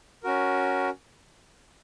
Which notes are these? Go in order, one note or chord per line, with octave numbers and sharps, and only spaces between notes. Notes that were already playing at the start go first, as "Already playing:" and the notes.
C#4 F#4 A#4